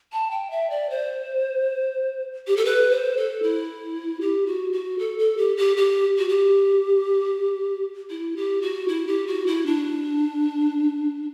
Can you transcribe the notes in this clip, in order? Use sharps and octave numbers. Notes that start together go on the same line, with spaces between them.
A5
G5
E5
D5
C5
G4
A4
B4
C5
A4
E4
G4
F#4
F#4
A4
A4
G4
G4
G4
F#4
G4
E4
G4
F#4
E4
G4
F#4
E4
D4